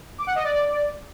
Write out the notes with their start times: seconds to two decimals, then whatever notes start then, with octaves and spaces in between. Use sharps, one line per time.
0.18 D6
0.27 F#5
0.35 D#5
0.44 D5